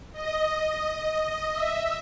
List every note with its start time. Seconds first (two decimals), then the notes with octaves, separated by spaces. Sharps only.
0.12 D#5
1.52 E5